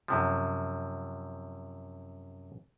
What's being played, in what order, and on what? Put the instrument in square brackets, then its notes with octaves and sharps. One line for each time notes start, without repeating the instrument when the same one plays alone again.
[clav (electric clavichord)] F#2 C3 F3